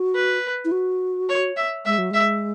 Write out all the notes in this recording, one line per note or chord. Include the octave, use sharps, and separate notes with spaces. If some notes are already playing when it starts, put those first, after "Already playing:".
Already playing: F#4
B4
E4
F#4
C#5
E5
G#3 E5
F#3
G#3 E5